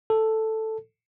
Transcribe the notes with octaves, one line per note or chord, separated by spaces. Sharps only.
A4